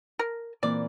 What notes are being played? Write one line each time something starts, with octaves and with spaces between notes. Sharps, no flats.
A#4
A#2 E3 C4 D5